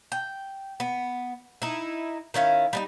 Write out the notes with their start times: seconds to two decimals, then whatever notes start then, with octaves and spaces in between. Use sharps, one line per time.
0.12 G5
0.80 B3
1.62 D#4 E4
2.34 D#3 C#4 E4 F5
2.73 G3 B3 D#4